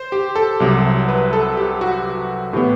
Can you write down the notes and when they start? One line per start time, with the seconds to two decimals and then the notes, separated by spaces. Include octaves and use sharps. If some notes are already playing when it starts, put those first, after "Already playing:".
Already playing: C5
0.12 G4
0.36 A4
0.60 C2 C3 F#3
1.09 B4
1.33 A4
1.57 G4
1.81 F#4
2.53 A2 E3 B3 G4